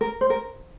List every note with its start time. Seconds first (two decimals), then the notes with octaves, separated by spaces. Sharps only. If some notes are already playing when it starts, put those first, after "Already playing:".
0.01 A#4
0.21 C5
0.30 A#4